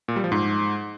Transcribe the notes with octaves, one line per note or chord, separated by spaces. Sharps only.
A#2
G3
F3
G#2